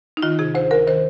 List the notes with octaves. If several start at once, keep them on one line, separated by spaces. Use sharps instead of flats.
D#4
D#3 F4
C3 G#4
D2 C5
D2 A#4
D#3 C5